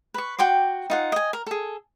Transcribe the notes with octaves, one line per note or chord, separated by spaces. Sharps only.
B4 C#6
F#4 G5 C6 D6
D#4 F4 F#5
D#5 G#5
A#4
G#4 A4